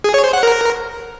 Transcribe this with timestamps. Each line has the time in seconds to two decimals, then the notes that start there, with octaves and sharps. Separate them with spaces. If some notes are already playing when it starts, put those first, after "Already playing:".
0.04 G#4
0.14 C#5
0.24 C5
0.33 F#5
0.43 A#4